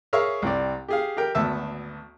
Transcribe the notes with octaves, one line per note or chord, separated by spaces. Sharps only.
G#4 A#4 C#5 E5 F5 C#6
C2 C4 D5
G4 G#4 F5
G4 A#4 G5
G#1 D2 B3 E5 A5 E6